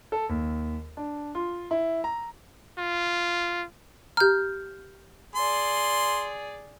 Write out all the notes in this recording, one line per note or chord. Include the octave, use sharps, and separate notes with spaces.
A4
D#2
D4
F4
E4
A#5
F4
G4 A#5 F6 G6
G#4 D5 C6